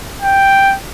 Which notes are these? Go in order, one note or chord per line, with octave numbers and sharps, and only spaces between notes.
G5